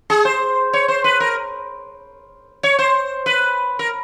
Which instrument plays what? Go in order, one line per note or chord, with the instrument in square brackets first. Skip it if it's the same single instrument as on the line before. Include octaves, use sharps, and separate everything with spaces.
[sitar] G#4
C5
C#5
C5
B4
A#4
C#5
C5
B4
A#4